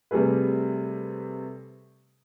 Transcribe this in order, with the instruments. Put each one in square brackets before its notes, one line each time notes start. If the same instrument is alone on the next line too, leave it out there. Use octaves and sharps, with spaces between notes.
[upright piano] C3 G3 A3 G#4 B4